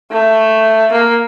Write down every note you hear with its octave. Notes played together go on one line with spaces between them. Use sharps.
A3
A#3